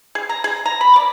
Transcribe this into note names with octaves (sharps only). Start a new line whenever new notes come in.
G#4
A#5
G#4
A#5
B5
D5